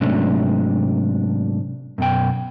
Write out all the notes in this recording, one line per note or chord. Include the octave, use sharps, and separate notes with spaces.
G#2 C3 F#3 A3 C#4 D4
F#2 B2 G5